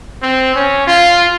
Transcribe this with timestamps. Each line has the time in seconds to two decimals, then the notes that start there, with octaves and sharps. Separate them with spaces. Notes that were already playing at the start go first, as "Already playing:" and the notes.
0.22 C4
0.55 C#4
0.87 F4